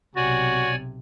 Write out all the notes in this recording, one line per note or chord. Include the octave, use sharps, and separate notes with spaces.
B1 C3 F#4 C#5 D5 G#5